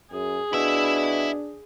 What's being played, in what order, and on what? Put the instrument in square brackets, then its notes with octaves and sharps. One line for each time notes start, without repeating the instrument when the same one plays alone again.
[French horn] F#2 [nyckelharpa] G#4
[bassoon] B2 [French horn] D4 [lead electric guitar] E4 E5